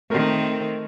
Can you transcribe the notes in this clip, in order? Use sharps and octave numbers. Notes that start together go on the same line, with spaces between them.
D#3 A3 C4 A#4